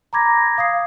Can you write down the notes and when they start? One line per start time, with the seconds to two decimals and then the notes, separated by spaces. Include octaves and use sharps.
0.13 A#5 B5 D6 G#6 A#6
0.58 F5 D#6 G#6 C7